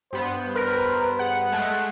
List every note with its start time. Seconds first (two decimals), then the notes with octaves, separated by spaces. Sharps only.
0.13 G2 B3 C5
0.55 A#4 B4
1.19 G#4 F#5
1.52 G#3 A3 E5